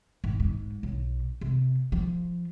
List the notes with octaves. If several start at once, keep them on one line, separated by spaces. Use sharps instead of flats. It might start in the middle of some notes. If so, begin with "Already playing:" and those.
G#1
G#2
B1
C3
F3